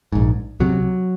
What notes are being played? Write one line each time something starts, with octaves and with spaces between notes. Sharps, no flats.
A#1 G#2
C#2 C3 F#3